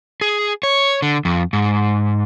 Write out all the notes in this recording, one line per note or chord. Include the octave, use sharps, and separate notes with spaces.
G#4
C#5
D3
F2
G#2